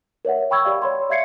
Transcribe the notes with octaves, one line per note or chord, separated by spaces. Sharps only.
A#4 C#5 E5 F#5
G5 B5 C#6 E6 G#6
G4 D5 F5
C#5 B5 C6
D5 E5 F5 G#6 C7 C#7